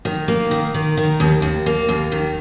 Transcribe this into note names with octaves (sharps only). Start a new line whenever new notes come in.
D#3
A#3
D#3
D#3
D#3
D#2
D#2
A#3
D#2
D#3